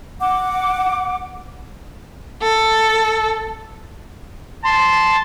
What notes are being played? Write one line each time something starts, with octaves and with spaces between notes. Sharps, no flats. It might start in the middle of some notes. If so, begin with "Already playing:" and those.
F#5 D6
A4
A5 C6